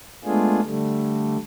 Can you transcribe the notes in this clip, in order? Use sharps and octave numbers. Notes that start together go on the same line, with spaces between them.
G#3 A3 B3 D4 F4 G#4
D3 G3 A3